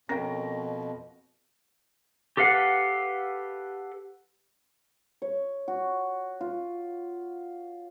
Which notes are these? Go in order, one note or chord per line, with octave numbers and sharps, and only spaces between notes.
F2 B2 C#4 A#4 G5 A#5 A#6
G4 A4 B4 F5 F#5
C#5
F#4
F4